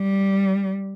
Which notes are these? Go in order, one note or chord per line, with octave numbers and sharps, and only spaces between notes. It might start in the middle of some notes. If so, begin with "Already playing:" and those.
Already playing: G3